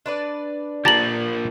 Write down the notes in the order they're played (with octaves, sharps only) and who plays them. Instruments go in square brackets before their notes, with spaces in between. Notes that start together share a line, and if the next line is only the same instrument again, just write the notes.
[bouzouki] D4 B4 D5
[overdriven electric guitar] F3 A#3 [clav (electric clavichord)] G4 A5 A#5 [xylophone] A6 F#7